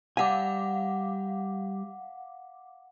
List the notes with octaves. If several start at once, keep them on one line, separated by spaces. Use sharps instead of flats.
G3 F5 F#5 G#5 D6